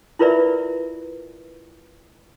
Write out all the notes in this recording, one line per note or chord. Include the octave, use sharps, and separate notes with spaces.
E4 F4 A#4 B4 D5 E5